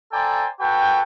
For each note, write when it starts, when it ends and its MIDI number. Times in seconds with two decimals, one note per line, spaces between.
0.12 0.48 69
0.12 0.48 72
0.12 0.48 74
0.12 0.48 79
0.12 0.48 80
0.12 0.48 82
0.60 1.02 66
0.60 1.02 69
0.60 1.02 71
0.60 1.02 79